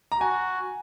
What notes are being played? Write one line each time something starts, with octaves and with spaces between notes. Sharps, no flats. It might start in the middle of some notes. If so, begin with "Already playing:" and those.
A#5
F#4 G#5